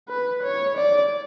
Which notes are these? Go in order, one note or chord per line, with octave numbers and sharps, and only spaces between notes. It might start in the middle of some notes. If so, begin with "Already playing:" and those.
B4
C#5
D5